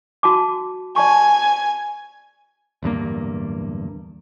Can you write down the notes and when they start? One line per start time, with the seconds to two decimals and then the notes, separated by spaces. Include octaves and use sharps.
0.23 F#4 A5 D6
0.96 D5 G#5 A5 C#6
2.83 D1 E2 G2 A#3